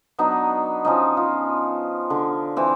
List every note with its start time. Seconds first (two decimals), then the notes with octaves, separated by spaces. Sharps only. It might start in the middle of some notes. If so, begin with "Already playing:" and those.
0.18 F#3 B3 D4 D#4
0.85 F3 C#4 D#4
1.17 F4
2.10 D3
2.57 E3 C4